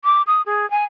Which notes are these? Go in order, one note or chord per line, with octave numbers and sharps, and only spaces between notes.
D6
D#6
G#4
G#5